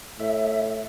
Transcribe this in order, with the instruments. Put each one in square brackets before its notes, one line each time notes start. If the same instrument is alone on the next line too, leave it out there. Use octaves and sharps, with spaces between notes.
[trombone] A2 [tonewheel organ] E5